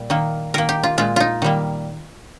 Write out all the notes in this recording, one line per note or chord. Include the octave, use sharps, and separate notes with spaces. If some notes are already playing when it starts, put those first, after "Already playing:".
Already playing: A#2 G3
D#3 A#3
D#3 A#3 A#4
G4
F4
A#2 G#3 F4
D#4 F4
D#3 G3 A#3